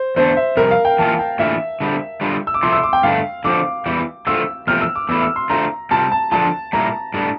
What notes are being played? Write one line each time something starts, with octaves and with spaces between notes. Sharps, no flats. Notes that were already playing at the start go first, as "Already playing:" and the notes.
Already playing: C5
E2 D3 A3 D4 C5
E5
F2 C3 G3 A#4
F5
G5
E3 A#3 F4 A5
G5
A2 E3 A#3 D4 F4 E5
D3 G3 C4
D3 G3 D4 F4
E6
D6
C3 F3 A3 E4 C6
E6
D6
G5
G2 D3 A3 D4 F5
D3 F3 C4 D6
E2 E3 G3
D3 A3 C4 F4 E6
E2 C3 F3 A3 C4 F6
E6
D6
E2 E3 A3 E4 E6
E6
C6
D3 A3 C4 F4 A#5
C3 G3 C4 F4 A5
A5
D3 F3 A3 D4 F4 A5
A#2 G3 A#3 E4 A#5
A2 G3 D4